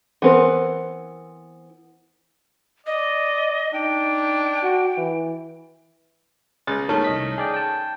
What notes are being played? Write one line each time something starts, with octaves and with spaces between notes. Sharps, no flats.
E3 B3 C4 A#4 B4
D5 D#5
D4 D#4 G5
F#4
E3
C#2 G#3 A6
D#3 A3 C#4
C2 D#5 B6
G#4 D5 G5
G5 A5